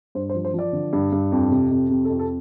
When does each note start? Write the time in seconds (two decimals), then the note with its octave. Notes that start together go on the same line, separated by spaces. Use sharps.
0.15 G2 C5
0.30 C5
0.35 F3
0.45 C5
0.54 F3 D5
0.73 D3
0.93 G2
1.12 G2
1.32 F2
1.51 C3
1.71 F2
1.90 C3
2.05 A4
2.10 F2
2.19 A4